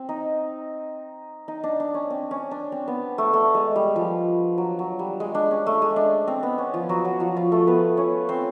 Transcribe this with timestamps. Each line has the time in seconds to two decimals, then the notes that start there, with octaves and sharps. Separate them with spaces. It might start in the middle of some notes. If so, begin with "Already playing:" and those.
Already playing: C4
0.09 D#4
1.48 D#4
1.64 D4
1.80 D4
1.94 C#4
2.10 C4
2.31 C#4
2.51 D4
2.72 C4
2.88 B3
3.18 A3
3.33 A3
3.55 G#3
3.76 G3
3.96 F3
4.58 F#3
4.79 F#3
4.99 G3
5.20 G#3
5.35 D4
5.51 C#4
5.67 A3
5.82 G#3
5.96 D4
6.28 C4
6.43 B3
6.58 C#4
6.74 F3 F4
6.89 F#3 F#4
7.05 F#3 F#4
7.20 F3 F4
7.36 F3 F4
7.52 A3 A4
7.67 B3 B4
7.97 C#4 C#5
8.29 C4 C5